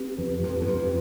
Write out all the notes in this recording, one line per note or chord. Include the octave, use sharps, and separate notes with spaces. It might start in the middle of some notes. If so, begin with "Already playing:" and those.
Already playing: C4 G4 B4
F2 B4
F2 B4
E2
F2 C4